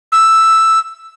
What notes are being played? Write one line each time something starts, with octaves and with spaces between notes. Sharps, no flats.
E6